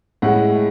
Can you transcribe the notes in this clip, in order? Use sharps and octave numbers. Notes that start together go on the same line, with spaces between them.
A2 G#3 F#5